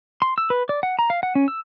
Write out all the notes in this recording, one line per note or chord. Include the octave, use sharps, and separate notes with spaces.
C6
E6
B4
D5
F#5
A#5
F5
F#5
C#4
E6